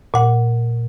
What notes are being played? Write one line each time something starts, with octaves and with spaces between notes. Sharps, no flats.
A#2 F#5